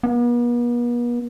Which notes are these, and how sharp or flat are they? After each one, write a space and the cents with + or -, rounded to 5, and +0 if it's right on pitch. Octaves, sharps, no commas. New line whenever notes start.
B3 -45